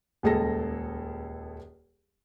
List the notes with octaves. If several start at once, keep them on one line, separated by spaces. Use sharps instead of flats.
D#1 C#2 G#4 A4 A#6